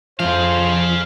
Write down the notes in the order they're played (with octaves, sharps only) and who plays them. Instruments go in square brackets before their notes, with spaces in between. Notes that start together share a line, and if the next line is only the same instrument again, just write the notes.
[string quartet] F2 [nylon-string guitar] F3 [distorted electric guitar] G#4 F5 [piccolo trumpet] C5